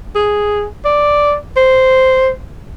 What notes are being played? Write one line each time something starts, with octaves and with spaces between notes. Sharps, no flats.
G#4
D5
C5